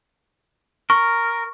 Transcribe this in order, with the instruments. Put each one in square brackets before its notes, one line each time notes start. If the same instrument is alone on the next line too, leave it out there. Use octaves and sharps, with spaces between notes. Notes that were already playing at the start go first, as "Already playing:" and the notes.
[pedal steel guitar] A#4 [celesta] C#6